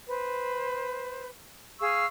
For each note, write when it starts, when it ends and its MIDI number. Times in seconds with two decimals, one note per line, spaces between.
0.08 1.29 71
0.08 1.29 72
1.80 2.06 68
1.80 2.06 77
1.80 2.06 85
1.80 2.06 88